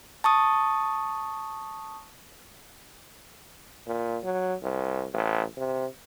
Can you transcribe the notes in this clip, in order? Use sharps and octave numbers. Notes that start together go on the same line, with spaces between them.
A5 C#6 D#6
A#2
F#3
C2
A1
C3